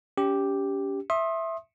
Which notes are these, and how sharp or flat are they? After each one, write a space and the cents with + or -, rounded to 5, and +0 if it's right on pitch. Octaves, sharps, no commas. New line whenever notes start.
C#4 +35 G4 +0
E5 +0 C6 +35 D#6 +0